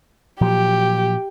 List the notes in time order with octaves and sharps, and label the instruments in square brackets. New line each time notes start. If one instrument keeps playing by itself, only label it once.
[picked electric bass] A#2 F3 F#3 [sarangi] G4